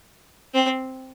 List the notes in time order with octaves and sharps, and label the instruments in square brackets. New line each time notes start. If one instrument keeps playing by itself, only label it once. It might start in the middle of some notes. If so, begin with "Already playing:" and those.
[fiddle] C4